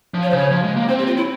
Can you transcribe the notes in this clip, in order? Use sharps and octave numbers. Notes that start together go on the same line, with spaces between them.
F3
C#5
C5
C#3 C#5
F3
G#3
A#3
C4 C5
G4
F4
E4